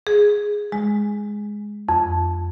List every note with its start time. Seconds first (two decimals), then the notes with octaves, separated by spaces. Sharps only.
0.07 G#4
0.72 G#3
1.89 F2